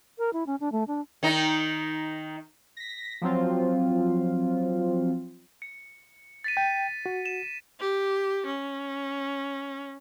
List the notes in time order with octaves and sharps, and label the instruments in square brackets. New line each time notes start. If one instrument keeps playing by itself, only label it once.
[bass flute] A#4
E4
C#4
D4
A3
D4
[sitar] D#3 D#4
[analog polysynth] A#6 B6
F3 F#3 C4 F4
[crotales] C#7
A6 B6 D#7
[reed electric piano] G5
F#4
[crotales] E7
[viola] G4
C#4